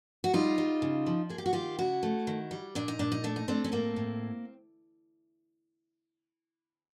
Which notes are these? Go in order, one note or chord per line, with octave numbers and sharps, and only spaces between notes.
F#4
G3 D#4 F4
G3
C#3
F3
A#3 G#4
G4
F#4
D#3 F4 G4
C#3 E4 F#4
A3
D#3
G3
A#2 D4
D#4
A#2 D4
D#4
A3 D4
D#4
A3 C4 D4
C#4
A2 A#3 C4
A2